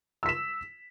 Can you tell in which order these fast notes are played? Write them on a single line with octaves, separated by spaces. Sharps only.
E6 B6 E7